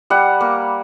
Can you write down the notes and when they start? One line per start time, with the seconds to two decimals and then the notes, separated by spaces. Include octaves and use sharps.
0.10 G3 F#5
0.41 A#3